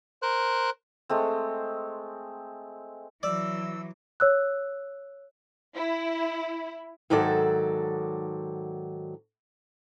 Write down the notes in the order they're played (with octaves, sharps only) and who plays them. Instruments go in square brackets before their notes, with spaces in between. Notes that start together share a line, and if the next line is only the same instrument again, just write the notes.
[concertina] A#4 C5 F#6
[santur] G#3 A3 C4
[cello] E3 F#3 [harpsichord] D5 [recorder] E6
[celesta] C#5 E6 F#6
[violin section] E4
[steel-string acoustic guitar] G#2 D#3 F#3 A4 D5 F#5